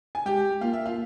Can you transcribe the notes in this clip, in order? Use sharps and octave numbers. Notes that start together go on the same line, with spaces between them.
G#5
G#3 G4 G5
A#3 F4 F5
E5
F4 F5